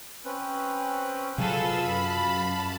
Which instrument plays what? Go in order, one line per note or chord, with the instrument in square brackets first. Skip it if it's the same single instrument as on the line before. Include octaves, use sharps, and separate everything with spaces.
[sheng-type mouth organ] C4 C#4 B4
[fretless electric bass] C3 F#3 [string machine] F4 E6 [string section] G#4 A4 B4 [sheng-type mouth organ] F5
[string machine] F#2 A5 [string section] B5